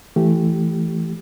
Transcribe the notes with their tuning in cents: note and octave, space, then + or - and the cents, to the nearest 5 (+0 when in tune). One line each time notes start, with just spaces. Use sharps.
E3 +15 A3 +0 G4 -15